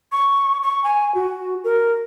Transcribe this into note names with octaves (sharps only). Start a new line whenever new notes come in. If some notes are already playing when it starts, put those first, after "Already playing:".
C#6
C#6
G#5
F#4
A#4